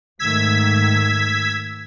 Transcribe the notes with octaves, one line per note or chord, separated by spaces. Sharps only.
G#2 D#3 A3 E6 G#6 B6